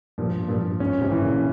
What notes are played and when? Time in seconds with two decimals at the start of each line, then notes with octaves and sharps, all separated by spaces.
0.18 G2 A#2 F3
0.48 G2 A#2 F3
0.80 G#2 C#4
1.01 G#2 C3
1.11 E3
1.21 A#2 C#3